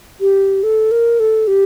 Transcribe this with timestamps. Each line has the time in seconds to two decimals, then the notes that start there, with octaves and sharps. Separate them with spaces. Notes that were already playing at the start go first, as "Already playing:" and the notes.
0.21 G4
0.63 A4
0.91 A#4
1.20 A4
1.48 G4